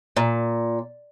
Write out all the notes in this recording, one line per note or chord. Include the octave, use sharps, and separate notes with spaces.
A#2